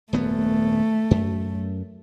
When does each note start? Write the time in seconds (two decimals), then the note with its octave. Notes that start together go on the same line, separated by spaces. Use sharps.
0.13 D#1 F#2 A3 B3
1.11 F#2